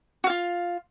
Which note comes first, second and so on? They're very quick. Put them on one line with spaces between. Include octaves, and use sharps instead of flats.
F#4 F5 F4